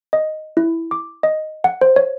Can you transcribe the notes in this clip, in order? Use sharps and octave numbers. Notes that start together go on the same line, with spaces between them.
D#5
E4
D6
D#5
F#5
C5
C#5